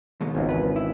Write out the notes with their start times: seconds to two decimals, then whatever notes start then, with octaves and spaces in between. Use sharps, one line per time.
0.21 D#2 G#2 B2
0.35 G#1 C#2
0.49 E2 B4
0.76 E4